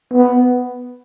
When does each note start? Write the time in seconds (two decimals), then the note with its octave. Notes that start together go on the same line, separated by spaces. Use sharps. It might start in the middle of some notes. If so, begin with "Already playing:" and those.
0.13 B3